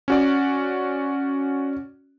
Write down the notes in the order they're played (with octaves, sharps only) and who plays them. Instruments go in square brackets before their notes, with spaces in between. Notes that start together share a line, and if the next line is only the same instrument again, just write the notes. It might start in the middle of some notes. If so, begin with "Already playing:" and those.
[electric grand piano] C#4 F#4 D5